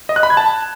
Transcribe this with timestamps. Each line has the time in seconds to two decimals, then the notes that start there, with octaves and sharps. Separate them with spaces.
0.09 D#5
0.16 F#6
0.23 B5
0.30 G#6
0.37 A5